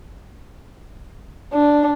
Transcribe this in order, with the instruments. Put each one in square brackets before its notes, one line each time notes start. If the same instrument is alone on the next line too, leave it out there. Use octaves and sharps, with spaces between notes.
[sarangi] D4